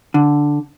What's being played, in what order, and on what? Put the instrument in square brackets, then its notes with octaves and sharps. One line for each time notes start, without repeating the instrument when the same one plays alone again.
[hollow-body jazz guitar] D3